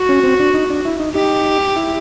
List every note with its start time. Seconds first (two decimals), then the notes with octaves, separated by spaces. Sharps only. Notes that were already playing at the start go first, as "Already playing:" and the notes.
Already playing: F#4
0.09 C#4
0.23 C4
0.40 D4
0.54 D#4
0.70 D4
0.85 E4
1.00 D#4
1.15 D#4 G4
1.76 E4